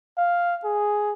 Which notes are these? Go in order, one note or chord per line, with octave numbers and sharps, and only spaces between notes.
F5
G#4